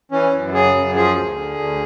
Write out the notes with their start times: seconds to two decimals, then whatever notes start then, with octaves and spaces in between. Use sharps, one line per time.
0.12 E3 C#4
0.33 F#2
0.53 C#3 G#4
0.75 F#2
0.95 F3 G#4
1.16 D2
1.37 D3
1.59 D2